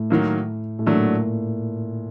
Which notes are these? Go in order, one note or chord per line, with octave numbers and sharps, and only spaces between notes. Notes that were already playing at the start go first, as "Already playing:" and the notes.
Already playing: A2
D#3 F#3 A#3
A2
A#2 D3 F#3 A3 D4